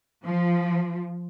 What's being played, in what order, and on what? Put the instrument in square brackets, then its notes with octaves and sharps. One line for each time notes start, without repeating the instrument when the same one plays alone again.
[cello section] F3